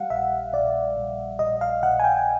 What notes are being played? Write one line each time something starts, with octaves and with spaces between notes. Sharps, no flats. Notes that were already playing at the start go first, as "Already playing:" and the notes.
Already playing: G3 F5 F#5
A#1 E5
A#1 D5
A#1
A#1 D#5
F5
A#1 F#5
G#5
G5